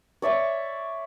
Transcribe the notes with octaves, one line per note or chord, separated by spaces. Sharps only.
C#5 D5 E5 C#6